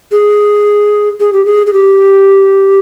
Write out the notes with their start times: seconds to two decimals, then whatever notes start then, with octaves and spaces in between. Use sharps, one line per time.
0.12 G#4
1.20 G#4
1.33 G4
1.45 G#4
1.67 G#4
1.73 G4